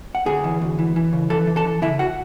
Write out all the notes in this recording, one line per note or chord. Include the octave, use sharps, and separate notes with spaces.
F#5
D2 G#4 G#5
E3
D2
E3
E3
C#3
E3 A4 A5
E3
A4 A5
E3
C#3 E4 E5
F#4 F#5